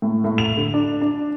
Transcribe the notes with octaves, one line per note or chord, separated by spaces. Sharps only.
A2
A2
F7
D3
D4
D4